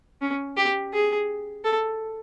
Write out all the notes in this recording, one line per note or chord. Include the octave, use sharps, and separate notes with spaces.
C#4
G4
G#4
A4